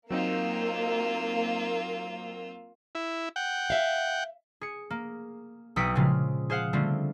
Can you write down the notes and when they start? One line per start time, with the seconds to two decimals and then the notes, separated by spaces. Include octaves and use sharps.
0.10 F#3 A#3 C4 D#4 F4 E6
2.95 E4
3.36 F#5 G5
3.70 E5 F5
4.61 G#4 C#7
4.90 A#3
5.76 B1 G5 D#6 E6 B6 C#7
5.95 A#2 C#3 F3 G#3 F4
6.50 G#4 C5 F5 F#5
6.73 D3 G3 A3 C4 F4